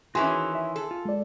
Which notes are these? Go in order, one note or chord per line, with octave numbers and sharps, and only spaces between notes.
D#3 E3 C#4 F#4 G#4 G#5 C6
E5
G#4 A4
F4
G#3 D5